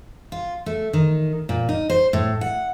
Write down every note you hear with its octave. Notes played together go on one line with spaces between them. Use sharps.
F4
A3
D#3
A#2
D#4
C5
A2
F#5